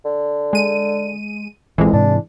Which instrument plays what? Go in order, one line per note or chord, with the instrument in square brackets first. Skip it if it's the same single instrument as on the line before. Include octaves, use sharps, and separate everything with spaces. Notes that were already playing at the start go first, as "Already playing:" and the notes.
[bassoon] D3
[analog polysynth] G#3 D#7
[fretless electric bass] A#1 C4 [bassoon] F2 [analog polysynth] E3 G#3
[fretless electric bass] G#2 C3 [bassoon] D4